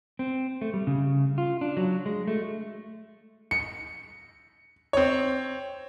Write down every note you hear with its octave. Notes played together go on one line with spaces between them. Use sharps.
C4
A3
G3
C#3
F4
D4
F#3
G#3
A3
C#7
C4 C#5